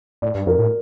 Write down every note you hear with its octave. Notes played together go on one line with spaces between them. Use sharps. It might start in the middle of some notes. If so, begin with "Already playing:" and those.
A2 D5
G2
F2 A#4
A2